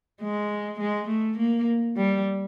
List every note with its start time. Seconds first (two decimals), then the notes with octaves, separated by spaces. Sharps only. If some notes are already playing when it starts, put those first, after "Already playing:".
0.22 G#3
0.80 G#3
1.09 A3
1.38 A#3
1.97 G3